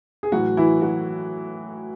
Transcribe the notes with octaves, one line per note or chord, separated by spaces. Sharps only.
G#4
A2 E3 F#3 F#4
E3 E4
F#3 F#4